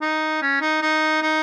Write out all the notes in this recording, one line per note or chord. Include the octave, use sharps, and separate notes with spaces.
D#4
C#4
D#4
D#4
D#4